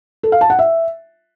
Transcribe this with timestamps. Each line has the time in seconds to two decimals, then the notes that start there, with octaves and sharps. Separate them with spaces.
0.23 A4
0.32 F5
0.41 A5
0.50 F#5
0.59 E5